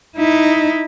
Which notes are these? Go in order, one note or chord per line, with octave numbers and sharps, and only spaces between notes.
D#4 E4